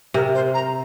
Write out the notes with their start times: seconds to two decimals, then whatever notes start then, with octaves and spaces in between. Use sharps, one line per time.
0.14 C3 A#4
0.34 C5
0.54 A#5